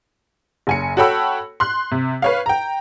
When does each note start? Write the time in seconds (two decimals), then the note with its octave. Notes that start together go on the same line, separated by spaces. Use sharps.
0.67 F#1 G#5 C#7
0.97 F#4 A4 C#5 G5 B5 E6
1.60 C6 F#6
1.91 C3
2.22 B4 C#5 F5
2.46 G5 A#5